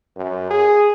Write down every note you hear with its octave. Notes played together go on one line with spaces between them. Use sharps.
F#2
G#4